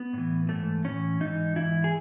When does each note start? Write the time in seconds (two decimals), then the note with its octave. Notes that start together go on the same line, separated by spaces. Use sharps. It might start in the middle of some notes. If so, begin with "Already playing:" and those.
Already playing: B3
0.13 A2 E3
0.49 G#2 E3 A3
0.85 A2 E3 C#4
1.20 G#2 E3 D#4
1.56 G#2 E3 E4
1.84 G#4